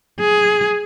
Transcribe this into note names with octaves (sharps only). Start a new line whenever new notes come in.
G#4